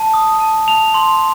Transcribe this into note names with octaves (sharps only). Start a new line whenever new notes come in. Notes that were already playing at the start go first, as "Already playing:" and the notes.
Already playing: A5
D#6
A5
A5 F7
C6